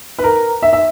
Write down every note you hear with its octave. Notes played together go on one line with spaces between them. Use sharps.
B4
A#4
E5
E5